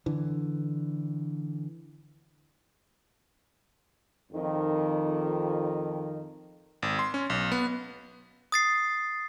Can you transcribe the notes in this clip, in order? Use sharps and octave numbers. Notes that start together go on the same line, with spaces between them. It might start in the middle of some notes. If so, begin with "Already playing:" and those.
D3 E3
F2 D#3
G#1
C6
C#4
B1
B3
D#6 A6 C7